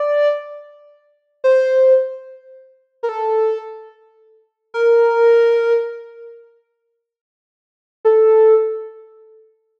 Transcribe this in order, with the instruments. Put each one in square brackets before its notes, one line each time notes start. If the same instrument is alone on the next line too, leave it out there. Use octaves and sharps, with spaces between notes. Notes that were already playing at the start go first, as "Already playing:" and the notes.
Already playing: [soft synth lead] D5
C5
A#4
A4
A#4
A4